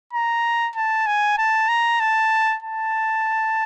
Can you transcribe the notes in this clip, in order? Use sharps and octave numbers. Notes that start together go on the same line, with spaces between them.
A#5
A5
G#5
A5
A#5
A5
A5